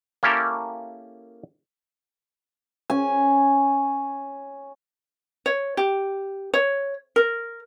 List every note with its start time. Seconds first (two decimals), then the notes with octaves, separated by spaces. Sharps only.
0.23 A#3 C#4 E4 G4 A4 A#4
2.90 C#4 G#5
5.46 C#5
5.77 G4
6.54 C#5
7.16 A#4